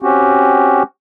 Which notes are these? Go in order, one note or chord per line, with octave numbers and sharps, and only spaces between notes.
C4 C#4 F#4 G4